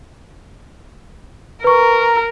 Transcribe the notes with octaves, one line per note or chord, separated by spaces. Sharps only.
A#4 B4 C#6